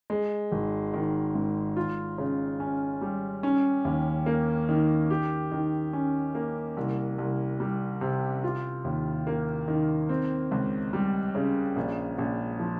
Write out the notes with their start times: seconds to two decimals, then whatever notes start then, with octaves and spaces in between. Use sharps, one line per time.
0.10 G#3
0.52 G#1
0.94 D#3
1.35 G#2
1.76 F4
2.18 C#3
2.60 C#4
3.01 G3
3.43 C#4
3.85 D#2
4.26 A#3
4.69 D#3
5.10 G4
5.52 D#3
5.93 C#4
6.35 A#3
6.77 C2
7.18 C2
7.60 G3
8.01 C3
8.44 F4
8.84 D#2
9.27 A#3
9.68 D#3
10.09 C4
10.51 C#2
10.93 G3
11.35 C#3
11.76 A#1
12.18 A#1
12.60 F3